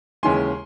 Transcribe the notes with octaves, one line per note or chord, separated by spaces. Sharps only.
D#2 C#3 E3 G#3 G#5 C6